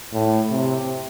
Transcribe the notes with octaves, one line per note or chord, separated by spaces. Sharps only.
A2
C3